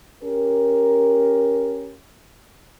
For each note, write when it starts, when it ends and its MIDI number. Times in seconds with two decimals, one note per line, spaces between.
0.24 1.97 61
0.24 1.97 67
0.24 1.97 70